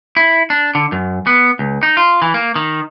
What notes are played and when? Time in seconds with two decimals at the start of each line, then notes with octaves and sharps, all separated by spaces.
0.17 E4
0.50 D4
0.75 D3
0.92 F#2
1.27 B3
1.59 C#2
1.83 D#4
1.97 F4
2.22 E3
2.34 A#3
2.56 D#3